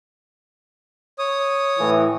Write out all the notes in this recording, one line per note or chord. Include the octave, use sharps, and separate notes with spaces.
C#5 D#6
A2 E3